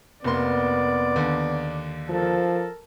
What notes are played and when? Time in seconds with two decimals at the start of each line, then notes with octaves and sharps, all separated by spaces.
0.24 F1 A#3 B3 D5 C6
1.16 D#2 D3
2.09 F3 A4 A#4